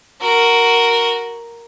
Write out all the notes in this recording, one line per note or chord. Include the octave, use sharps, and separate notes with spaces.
F#4 A#4